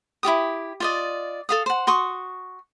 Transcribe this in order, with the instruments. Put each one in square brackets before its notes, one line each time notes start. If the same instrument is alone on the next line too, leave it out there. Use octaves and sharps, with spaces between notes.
[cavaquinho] E4 F4 G4 D#6
F4 D5 D#5
A4 F5 D#6
C5 F#5
F#4 C6 C#6 D#6